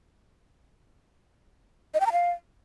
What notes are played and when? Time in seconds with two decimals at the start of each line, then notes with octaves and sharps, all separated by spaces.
1.94 D#5
2.00 G5
2.06 A#5
2.12 F5